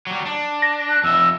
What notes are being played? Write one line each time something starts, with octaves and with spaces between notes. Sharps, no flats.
F#3 G3
D4
A#6
F#6
F2 E5 E6